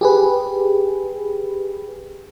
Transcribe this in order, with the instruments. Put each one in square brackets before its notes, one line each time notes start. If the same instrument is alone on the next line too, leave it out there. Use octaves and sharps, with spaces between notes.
[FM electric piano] G4 G#4 B4